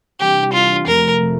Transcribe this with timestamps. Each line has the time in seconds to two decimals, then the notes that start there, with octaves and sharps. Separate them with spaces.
0.19 C3 E3 G3 D4 G4
0.52 C3 E3 G3 D4 F4
0.86 F2 C3 F3 A3 A#4
1.20 C3 F3 A3